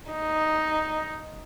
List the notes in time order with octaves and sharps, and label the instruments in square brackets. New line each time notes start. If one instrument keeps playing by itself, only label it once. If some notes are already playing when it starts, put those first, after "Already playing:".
[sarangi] D#4